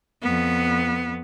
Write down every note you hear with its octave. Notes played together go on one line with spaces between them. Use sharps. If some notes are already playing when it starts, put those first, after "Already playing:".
F2 B3